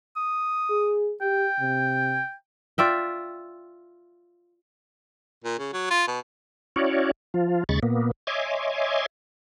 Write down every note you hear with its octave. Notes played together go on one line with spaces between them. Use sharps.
D#6
G#4
G4 G5
C3
F4 D5 E5 G5
A#2
C#3
F#3
F4
B2
C#4 E4 F#4 C#5 D5
F3 F4
D#2 C#3 G#3 B5 C#6 A6
A#2 A#3 B3
C#5 D#5 E5 G#5 C6 D6